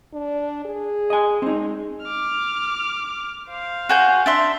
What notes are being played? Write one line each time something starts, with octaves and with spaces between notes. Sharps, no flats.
D4
G#4
D#5 G#5
G#3 C4 D#4
D6 F6
C5 F5
F#4 G#5 G6
D4 E5 C6